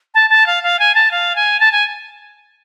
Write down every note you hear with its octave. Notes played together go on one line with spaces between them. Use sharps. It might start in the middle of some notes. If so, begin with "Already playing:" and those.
A5
A5
F5
F5
G#5
A5
F5
G#5
A5
G#5